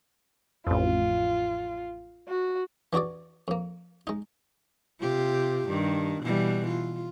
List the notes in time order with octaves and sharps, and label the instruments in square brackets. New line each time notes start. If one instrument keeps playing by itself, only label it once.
[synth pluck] A1 F2 [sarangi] F4
[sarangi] F#4
[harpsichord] E3 D4 F#4 G#4 D5
F2 A#3
G#3 D#4
[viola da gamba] C3 F4 G4
G2 D#3
B2 E3 G3
F4